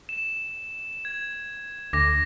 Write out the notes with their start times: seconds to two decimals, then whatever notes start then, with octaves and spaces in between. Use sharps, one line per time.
0.09 E7
1.05 G#6
1.93 D2 D6 A#6